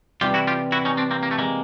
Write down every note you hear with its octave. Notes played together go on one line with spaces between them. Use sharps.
C3 E3 G3 F4 G4
E4 F#4
F4 G4
E4 F#4
C#4 D#4
C4 D4
A#3 C4
A#3
A3
G#3 A#3